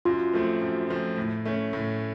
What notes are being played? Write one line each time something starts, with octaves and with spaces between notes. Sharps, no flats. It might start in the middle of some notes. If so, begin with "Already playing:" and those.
F#2 F4
F3 A3 C4
F#2
F3 A3 C4
A2
A3 C#4
A2